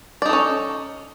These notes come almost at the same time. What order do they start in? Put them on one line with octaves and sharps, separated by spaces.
D5 D#4 A4 C#4